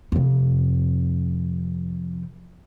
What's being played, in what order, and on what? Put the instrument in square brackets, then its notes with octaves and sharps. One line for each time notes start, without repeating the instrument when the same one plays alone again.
[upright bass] F2 C3